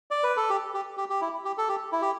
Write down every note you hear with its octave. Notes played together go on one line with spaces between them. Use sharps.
D5
B4
A4
G4
G4
G4
G4
E4
G4
A4
G4
E4
G4